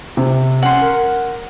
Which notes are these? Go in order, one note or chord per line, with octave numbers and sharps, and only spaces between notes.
C3
C#4 F#5 C6
A#4